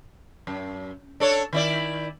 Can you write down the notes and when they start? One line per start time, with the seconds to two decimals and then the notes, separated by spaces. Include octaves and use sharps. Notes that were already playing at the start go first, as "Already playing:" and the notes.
0.47 F#2
1.20 D4 A4 C#5
1.53 D#3 E4 D5